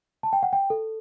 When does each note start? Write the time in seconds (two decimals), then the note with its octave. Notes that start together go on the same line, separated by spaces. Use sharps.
0.23 A5
0.33 G5
0.43 F#5
0.53 G5
0.70 A4